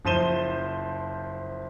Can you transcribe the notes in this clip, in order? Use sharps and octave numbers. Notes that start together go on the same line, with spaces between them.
F#1 F3 C5 D#7 E7 G7